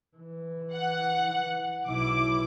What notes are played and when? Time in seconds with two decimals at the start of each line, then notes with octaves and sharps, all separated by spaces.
0.17 E3
0.73 F#5
1.86 B1 E4 D6